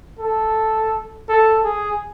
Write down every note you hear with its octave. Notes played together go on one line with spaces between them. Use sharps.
A4
A4
G#4